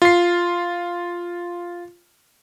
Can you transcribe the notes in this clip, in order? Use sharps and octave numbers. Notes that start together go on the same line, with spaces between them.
F4 C7